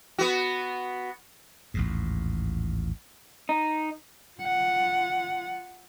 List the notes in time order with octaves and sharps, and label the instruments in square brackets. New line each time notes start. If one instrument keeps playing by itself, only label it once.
[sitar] B3 F#4
[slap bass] A1 D#2 G#2
[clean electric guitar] D#4
[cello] F4 F#5